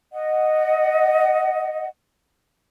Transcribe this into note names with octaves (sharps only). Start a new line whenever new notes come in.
D#5 F#5